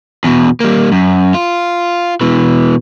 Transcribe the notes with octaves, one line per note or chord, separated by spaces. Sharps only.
E2 B2
G3 A#3
F#2
F4
B2 E3